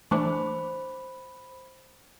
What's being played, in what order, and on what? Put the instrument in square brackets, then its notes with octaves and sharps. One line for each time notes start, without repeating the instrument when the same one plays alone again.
[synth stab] E3 A3 D4 [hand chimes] C5 B5